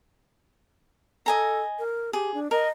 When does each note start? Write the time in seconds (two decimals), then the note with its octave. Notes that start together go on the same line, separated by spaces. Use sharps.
1.26 A4 D#5 G#5 A#5
1.79 A#4
2.13 G4 G#4
2.34 D4
2.51 A#4 D#5